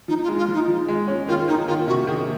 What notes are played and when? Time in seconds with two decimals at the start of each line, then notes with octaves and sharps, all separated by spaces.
0.08 F3 D#4
0.23 F4
0.28 G#3
0.38 F4
0.48 F3
0.54 D#4
0.68 F3
0.88 G#3
1.08 C#4
1.28 D#3 F4
1.48 D#3 D#4
1.67 D#3 F4
1.88 C3 F#4
2.07 D#3 G#4